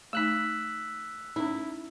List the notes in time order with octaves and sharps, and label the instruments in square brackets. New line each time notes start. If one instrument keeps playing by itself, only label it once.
[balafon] A3 D#4 [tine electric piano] E6 F#6 B6
[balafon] C#4 D#4 [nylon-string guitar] E4